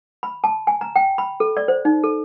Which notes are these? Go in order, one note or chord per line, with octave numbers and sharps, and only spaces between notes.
B5
A5
G#5
A#5
G5
B5
A4
D5
C5
D#4
A4